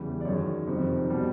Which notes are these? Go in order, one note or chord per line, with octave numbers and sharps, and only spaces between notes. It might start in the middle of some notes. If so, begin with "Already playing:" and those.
Already playing: E2 C#3 E3 G3
D5
F#2 D#3 G#3 C#5
F2 C3 D#3 G3
B2 G3